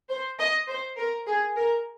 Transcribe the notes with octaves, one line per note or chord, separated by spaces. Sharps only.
C5
D#5
C5
A#4
G#4
A#4